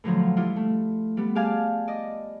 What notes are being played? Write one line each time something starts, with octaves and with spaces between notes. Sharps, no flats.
A2 D3 F3 F#3
G3 E4 F4
A3
G3 B3
G4 G#4 D5 F5 G#5 A5
D5 D#5